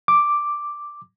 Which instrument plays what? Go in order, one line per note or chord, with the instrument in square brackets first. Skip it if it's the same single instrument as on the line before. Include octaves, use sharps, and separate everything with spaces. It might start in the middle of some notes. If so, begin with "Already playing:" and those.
[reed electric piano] D6